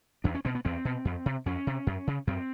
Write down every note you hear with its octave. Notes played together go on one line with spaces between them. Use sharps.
E2 D4
C#4
B2 C4
B3
E2 C4
B2
F2
C3
F2 C#4
C3
F#2
C#3
F#2 C4